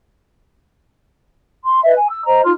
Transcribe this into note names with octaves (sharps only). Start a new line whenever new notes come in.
C6
B4 D#5 E5
G#5
E6
C5 D#5 A#5
D#4 F4 C6 F6